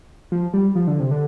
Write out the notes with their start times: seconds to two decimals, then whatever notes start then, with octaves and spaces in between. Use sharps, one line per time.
0.32 F3
0.53 G3
0.75 F3
0.87 D3
1.00 C3
1.11 D3